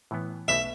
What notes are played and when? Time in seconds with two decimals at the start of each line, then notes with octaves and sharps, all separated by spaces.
0.11 A2 E3 B3
0.48 B1 B2 A3 E5